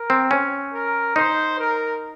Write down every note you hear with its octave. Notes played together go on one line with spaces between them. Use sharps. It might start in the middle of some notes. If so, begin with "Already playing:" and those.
Already playing: A#4
C4
C#4
A#4
D#4 C5
A#4